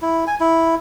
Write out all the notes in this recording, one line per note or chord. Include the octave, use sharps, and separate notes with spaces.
E4
G#5
E4